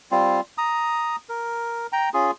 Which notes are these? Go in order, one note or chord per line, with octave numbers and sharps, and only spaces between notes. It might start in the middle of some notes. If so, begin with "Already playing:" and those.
G3 C4 F4
A#5 D#6
A#4
G5 A#5
C#4 F4 G#4